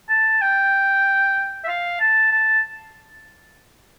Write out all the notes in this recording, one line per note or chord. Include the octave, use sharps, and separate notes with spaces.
A5
G5
E5
F5
A5
A5